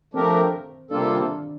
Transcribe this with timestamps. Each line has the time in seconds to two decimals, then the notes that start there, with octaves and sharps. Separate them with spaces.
0.14 F3 A3 C4 D4 G4 A#4
0.91 C3 G3 A#3 D4 F4 A4
1.11 D4